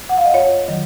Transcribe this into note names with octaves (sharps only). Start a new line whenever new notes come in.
F#5
F5
D#5
F2 C#5
D#3 F#3